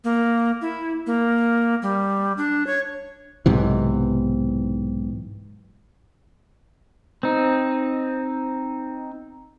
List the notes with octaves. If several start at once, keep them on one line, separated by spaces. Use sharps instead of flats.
A#3
E4
A#3
G3
D4
C#5
B1 G#2 C3 E3
C4 D#4